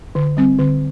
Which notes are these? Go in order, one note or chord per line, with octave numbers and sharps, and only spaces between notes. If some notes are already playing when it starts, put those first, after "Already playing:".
D3
G3 C4
D3